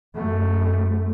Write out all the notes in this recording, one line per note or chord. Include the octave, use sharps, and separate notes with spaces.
F#2 A3